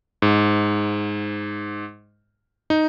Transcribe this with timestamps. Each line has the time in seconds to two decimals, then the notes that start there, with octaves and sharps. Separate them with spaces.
0.22 G#2
2.70 D#4